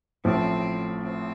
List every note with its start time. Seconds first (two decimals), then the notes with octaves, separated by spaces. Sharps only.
0.25 A1 A2 F3 C4
1.03 C4